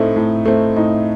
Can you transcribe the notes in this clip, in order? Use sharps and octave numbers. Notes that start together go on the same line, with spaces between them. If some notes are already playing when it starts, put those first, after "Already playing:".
Already playing: A2 A3 C4 D#4
A2
A3 C4
A2 D#4